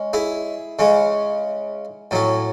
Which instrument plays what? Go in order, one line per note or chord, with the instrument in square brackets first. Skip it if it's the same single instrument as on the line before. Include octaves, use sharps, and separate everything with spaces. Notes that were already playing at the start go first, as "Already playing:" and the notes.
Already playing: [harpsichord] G#3 C#4
E4 G#4
C#3 G#3 C#4
A2 F#3 C#4